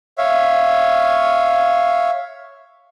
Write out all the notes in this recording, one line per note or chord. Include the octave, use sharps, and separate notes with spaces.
C#5 E5 F5